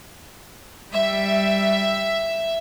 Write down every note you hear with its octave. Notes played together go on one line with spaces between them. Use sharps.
G3 E5